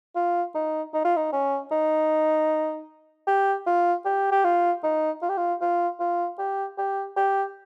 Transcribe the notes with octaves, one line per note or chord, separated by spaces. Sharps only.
F4
D#4
D#4
F4
D#4
C#4
D#4
G4
F4
G4
G4
F4
D#4
F4
G4
F4
F4
F4
G4
G4
G4